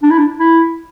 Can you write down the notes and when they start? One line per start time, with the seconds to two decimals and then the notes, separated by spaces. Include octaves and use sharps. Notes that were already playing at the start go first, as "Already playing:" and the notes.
0.03 D4
0.10 E4
0.18 D4
0.38 E4